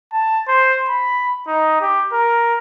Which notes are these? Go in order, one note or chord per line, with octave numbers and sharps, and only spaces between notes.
A5
C5
B5
D#4
G4
A#4